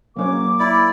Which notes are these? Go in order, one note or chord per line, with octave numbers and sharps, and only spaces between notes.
F#3 A#3 C#4 C#5 D6
E4 D5